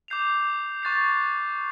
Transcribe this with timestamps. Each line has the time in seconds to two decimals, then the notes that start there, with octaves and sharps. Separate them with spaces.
0.08 D6 G6 C7 F7
0.83 C#6 F#6 A6 C7